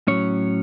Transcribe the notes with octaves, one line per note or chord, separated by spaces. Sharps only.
A2 F#3 C#4 C#5